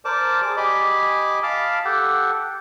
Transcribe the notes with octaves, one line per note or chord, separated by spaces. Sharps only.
A#4 C5 D5 A5 D6
G#4 D5 D6
G4 D#5 G#5 B5 D6
F5 A5 B5 D6 F6
G4 A4 F#5 G5